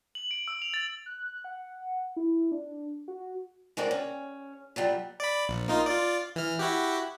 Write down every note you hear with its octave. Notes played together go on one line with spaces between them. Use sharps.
F#7
D7
E6
F7
A6
F#6
F#5
E4
D4
F#4
G#3 A3 C4 F#4 A#4 D5
C#4
A#2 F#3 G3
D5 B5
A#1
A#3 D#4 F4
F4 D5
E3 F6
E4 F#4 G4